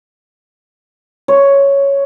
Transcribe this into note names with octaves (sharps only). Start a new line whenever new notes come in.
C#5